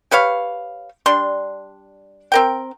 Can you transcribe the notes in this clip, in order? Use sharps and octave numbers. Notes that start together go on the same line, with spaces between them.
G4 B4 C#5 F5
G3 D4 C6
C4 A#4 G5